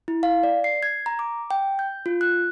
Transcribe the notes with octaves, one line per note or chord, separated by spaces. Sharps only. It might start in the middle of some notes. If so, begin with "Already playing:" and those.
E4
F5
D5
C7
G#6
A#5
D6
G5
G6
F4
F#6